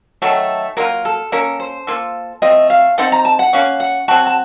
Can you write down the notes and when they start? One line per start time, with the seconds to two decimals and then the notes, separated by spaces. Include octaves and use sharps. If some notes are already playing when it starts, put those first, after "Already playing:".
0.22 D#3 F#3 A3 A4
0.77 F#3 A#3 F4 A#4
1.05 A4
1.32 A#3 C#4 A4 A#4
1.60 C5
1.87 A#3 F4 A4
2.42 F3 A3 C4 D#5
2.70 F5
2.98 C4 D#4 A4 C5 F#5
3.12 A#5
3.25 A5
3.39 F#5
3.53 A#3 C#4 F#4 F5
3.80 F#5
4.08 F#3 C4 F#4 A5
4.27 A5